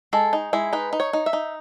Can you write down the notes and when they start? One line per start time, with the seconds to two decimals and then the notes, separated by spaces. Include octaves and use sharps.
0.13 G#3 A4
0.33 D#4
0.53 G#3 E4
0.73 D#4 B4
0.93 D#4
1.00 C#5
1.13 D#4
1.26 E5
1.33 D#4